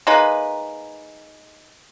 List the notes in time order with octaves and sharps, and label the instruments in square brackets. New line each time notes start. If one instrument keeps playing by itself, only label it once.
[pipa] G#3 A#3 D#4 B4